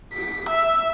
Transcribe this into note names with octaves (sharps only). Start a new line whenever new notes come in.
B6
E5